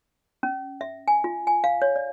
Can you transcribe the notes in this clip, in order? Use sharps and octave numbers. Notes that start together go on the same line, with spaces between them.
C#4
E5
G#5
F4
G#5
F5
C#5
D5